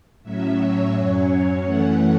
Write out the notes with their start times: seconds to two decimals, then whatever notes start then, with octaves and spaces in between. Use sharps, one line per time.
0.23 A2 F#3 C#4 E5
0.58 C#5
0.94 F#2 F#3 C#4 C#5
1.64 F#2 E3 A3 C#4 F#5